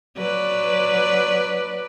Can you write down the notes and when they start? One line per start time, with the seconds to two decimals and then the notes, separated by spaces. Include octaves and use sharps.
0.18 F#3 B4 D5